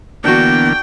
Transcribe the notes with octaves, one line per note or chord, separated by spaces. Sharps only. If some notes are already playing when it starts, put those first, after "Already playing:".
D3 E3 A#3 B3 D4 F#4 G5